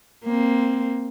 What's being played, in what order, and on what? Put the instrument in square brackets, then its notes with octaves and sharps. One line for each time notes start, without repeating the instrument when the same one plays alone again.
[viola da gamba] A#3 C4